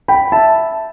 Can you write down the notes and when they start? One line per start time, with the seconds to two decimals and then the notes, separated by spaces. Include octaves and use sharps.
0.08 G5 B5
0.32 E5 A5